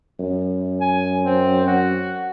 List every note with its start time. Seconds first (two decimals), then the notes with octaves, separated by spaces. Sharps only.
0.19 F#2
0.81 G#5
1.24 C4
1.67 F#4